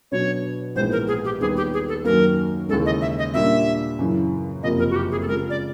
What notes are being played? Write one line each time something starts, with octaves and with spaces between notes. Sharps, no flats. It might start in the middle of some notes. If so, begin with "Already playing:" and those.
B2 F#3 B3 D4 F#4 C#5
A#1 G#2 E3 G#3 B3 C5
A#4
G#4
G4
D#2 D#3 G3 B3 G#4
G4
G#4
A4
F#2 D#3 F#3 A#3 A#4
D#2 C#3 E3 G#3 A4
D#5
E5
D#5
A#2 G3 A#3 D4 E5
F#2 C#3 E3
F#1 F2 C3 F3 A#3 D#5
A#4
F#4
G4
G#4
A4
C#3 F3 G#3 A#4
D5